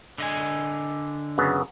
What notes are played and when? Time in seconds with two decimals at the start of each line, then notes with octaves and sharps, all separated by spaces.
0.18 D3 D#5 G#5
1.38 F#2 C#3 B3